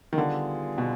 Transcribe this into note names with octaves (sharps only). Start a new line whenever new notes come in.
D#3
D3 G3 B3 F4 G#4
B2